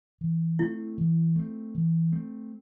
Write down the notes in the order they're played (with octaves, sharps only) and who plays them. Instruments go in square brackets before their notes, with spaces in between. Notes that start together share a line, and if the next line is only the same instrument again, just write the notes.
[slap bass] E3
[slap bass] A3 C4 [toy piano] E4
[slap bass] E3
A3 C4
E3
A3 C4